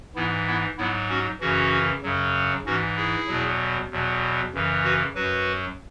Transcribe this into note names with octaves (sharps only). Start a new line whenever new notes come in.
G#2 E3 B3 E4
B3 E4
G#2 F#3 B3 E4
C#4 F#4
F#2 C#3 E3 C#4 F#4
F#2 C#3 F#3
G#2 E3 C#4 F#4
E4 G#4
E2 B2 F#3
E2 B2 F#3
F#2 C#3 E3
F#4 B4
F#2 F#3 F#4 B4